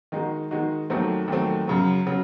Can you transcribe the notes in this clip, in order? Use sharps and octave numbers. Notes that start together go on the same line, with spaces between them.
D#3 G#3 D#4 F#4
D#3 G#3 D#4 F#4
D#2 D#3 F#3 A3 C4
D#2 D#3 F#3 A3 C4
F#2 C#3 F#3
C#3 F#3